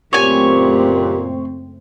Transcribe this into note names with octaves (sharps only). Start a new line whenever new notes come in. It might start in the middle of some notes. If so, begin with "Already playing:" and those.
F#1 A#2 A3 C4 G4 C#5 G#5